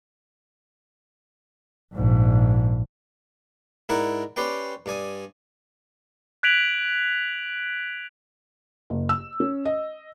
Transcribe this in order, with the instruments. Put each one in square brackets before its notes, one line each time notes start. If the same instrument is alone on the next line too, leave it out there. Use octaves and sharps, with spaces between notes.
[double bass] A#1 G#2
[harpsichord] G#2 E4 A#4 D5 F#5 D6
C#4 G4 B4 C5 D5 G5
G2 D5 G#5 D#6
[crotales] F#6 G#6 B6 D7 F7 F#7
[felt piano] F#1
E6
C#4
D#5